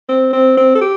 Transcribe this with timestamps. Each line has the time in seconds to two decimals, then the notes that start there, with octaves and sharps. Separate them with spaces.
0.09 C4
0.33 C4
0.57 C4
0.75 A4
0.81 G4